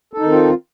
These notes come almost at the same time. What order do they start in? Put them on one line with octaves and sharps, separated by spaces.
A4 D#4 D#3 C4 F4